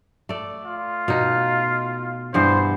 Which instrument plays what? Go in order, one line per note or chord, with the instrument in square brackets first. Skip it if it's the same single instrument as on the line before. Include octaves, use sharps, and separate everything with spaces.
[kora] A3 D5
[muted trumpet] F4
[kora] B2 D#4
[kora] G2 E3 B3 [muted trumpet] C5